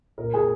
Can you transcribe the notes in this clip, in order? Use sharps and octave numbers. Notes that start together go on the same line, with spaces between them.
A#2 A#4
G#4 G#5